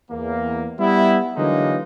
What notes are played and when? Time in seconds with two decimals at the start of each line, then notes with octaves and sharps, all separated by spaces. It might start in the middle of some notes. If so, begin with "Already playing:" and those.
0.11 E2 A#3
0.79 G3 B3 E4
1.36 D3 E3 F#3 G#3 A#3 D#4